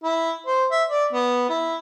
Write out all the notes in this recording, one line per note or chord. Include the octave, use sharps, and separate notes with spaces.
E4
C5
E5
D5
B3
E4